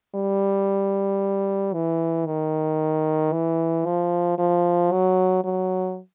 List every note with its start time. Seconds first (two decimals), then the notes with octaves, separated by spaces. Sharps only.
0.15 G3
1.74 E3
2.26 D#3
3.32 E3
3.86 F3
4.38 F3
4.92 F#3
5.44 F#3